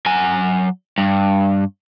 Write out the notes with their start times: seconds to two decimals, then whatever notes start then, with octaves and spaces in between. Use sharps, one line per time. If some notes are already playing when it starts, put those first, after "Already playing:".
0.06 F#3 G#5
0.98 G2